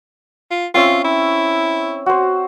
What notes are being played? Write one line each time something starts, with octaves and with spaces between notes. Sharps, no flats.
F4
C4 C#4 F4 E5
E4
F#4 C5